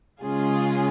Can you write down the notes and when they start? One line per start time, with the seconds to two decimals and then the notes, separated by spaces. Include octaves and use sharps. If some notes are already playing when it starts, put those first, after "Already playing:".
0.22 C#3 G#3 C#4 F4 G#4